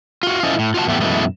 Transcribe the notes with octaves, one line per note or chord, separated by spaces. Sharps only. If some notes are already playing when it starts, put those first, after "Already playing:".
F4 F#4
C#4 E4 F4 A4 C5 D#5
A2
F4 F#4 D#5 A5
E2 A2 A3 B3 G4
F#2 B2 E3 G#3 A3